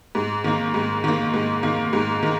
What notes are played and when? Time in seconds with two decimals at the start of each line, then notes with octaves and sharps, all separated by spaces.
0.15 G#2
0.44 D#3 A#3
0.74 G#2
1.04 D#3 A#3
1.34 G#2
1.63 D#3 A#3
1.93 G#2
2.23 D#3